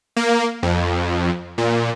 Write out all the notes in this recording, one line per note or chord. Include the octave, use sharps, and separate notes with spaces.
A#3
F2
A#2